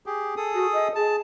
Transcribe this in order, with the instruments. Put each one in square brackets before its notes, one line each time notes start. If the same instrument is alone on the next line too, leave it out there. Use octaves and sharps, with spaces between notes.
[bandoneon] G4 G#4
G#4 A4 D#6
[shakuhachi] F#4
D#5
[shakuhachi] G#4 [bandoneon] A5